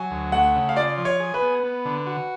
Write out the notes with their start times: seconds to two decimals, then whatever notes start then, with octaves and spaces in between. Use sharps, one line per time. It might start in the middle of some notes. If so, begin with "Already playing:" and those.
Already playing: F#3 G#5
0.11 D2
0.32 A3 F#5
0.55 C#3
0.69 F5
0.76 F4 D5
0.97 F3
1.05 C#5
1.20 G#4
1.34 B4
1.42 B3
1.63 B3
1.85 D3
2.06 F#4